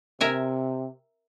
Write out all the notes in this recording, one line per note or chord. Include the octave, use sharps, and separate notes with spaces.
C3 A#4 E5 G#5